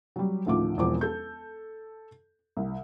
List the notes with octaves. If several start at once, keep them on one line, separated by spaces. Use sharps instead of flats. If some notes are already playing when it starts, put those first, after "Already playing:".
F#3 G3
A1 D2 D#3 F3 F4 D6
E1 E2 F3 C4 D6
A4 G6
C2